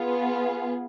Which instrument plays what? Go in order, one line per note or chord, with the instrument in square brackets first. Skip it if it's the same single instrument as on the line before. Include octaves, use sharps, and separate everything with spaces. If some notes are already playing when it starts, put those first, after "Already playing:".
Already playing: [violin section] B3 F4 G#4